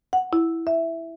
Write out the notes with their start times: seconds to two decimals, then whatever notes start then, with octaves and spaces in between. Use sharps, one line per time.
0.13 F#5
0.33 E4
0.67 E5